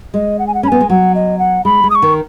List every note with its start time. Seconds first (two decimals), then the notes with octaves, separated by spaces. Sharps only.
0.14 G#3 D#5
0.39 F#5
0.47 G#5
0.54 F#5
0.63 C#4 B5
0.68 B3 G#5
0.81 G#3
0.90 F#3 F#5
1.15 D#5
1.39 F#5
1.65 G#3 B5
1.84 G#3
1.90 D#6
1.95 C#6
2.02 D#3